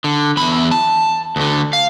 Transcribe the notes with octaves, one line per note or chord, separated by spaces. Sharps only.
D3
E2 B5
A5
D2 D3
F5